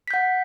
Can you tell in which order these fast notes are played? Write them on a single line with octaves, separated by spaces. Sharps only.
B6 G6 F#5